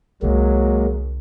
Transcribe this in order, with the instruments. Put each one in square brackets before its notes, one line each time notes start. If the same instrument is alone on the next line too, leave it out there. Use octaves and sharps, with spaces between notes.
[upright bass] C2 D3 [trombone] F#3 [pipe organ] G#3 A#3